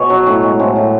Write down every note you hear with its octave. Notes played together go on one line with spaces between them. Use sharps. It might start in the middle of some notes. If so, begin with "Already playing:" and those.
Already playing: B2 G#4 C#5
F#3
A2
G#3
A2 C5
A2